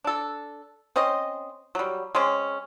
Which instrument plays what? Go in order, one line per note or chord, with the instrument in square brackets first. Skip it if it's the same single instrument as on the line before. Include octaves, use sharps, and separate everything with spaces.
[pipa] D4 A4
C4 C#4 C5 D#5
F#3 G3
G#3 C4 C#4